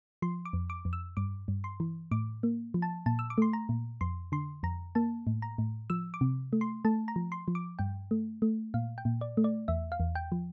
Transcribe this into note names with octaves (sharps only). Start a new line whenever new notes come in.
F3 C6
D6
F2
D6
F2
E6
G2 D6
G2
C6
E3
A2 D6
A#3
F3
A5
A#2 A5
E6
D6
A3 C6
A#5
A#2
F2 C6
D3 C6
F2 A#5
A#3 A5
A2
A#5
A2
F3 E6
D6
C3
A3
C6
A3 A5
A#5
F3
C6
F3
D6
G2 G5
A3
A3
A#2 F5
G5
A#2
D5
A3
D5
E2 E5
F5
E2
G5
F3